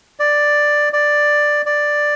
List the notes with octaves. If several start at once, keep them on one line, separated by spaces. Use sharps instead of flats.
D5
D5
D5